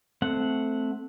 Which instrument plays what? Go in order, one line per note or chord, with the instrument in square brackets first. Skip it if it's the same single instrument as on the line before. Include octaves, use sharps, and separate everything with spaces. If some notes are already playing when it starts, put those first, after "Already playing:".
[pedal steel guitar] A3 C4 F#5